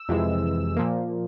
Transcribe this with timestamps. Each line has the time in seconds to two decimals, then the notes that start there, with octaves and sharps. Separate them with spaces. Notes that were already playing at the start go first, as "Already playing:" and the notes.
Already playing: E6
0.09 F2 C3 E3 G#3
0.77 A#2 F3 A#3